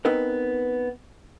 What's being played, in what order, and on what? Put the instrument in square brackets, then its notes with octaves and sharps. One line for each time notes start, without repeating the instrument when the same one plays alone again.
[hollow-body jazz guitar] B3 C4 D#4 A#4 B4